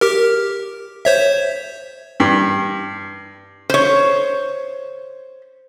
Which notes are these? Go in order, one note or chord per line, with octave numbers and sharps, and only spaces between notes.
G4 A#4
C5 C#5 E5
G2
C5 C#5